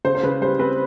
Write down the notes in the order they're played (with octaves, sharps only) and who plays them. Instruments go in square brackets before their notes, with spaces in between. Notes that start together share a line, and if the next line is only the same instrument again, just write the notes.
[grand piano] C#3 [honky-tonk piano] C5
[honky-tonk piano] C5
[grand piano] C#3 [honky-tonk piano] B4
[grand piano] G3 [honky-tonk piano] C5
[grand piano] C4 [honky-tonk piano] B4